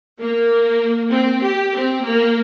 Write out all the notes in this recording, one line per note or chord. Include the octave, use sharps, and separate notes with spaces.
A#3
C4
G4
C4
A#3